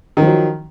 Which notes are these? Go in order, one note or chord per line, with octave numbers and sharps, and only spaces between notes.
D#3 F3 F#3